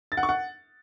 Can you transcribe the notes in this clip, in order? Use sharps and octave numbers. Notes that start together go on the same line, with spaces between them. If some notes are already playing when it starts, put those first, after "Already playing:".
A6
F#5
C#6
F#5